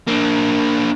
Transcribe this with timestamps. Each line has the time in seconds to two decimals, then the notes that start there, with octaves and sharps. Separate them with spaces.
0.08 A#3 D4